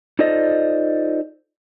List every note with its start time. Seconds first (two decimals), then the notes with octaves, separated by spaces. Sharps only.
0.19 D#4 F4 A4 C5 D5 D#5